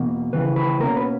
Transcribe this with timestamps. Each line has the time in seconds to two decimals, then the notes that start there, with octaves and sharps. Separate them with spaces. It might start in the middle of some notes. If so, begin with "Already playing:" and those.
Already playing: E2 B2 A#3
0.33 D#2 C#3 E3 B4
0.56 B4
0.80 B2 A#3 C#4 A#4
0.96 B4